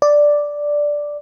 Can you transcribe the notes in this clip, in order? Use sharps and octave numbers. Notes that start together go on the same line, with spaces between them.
D5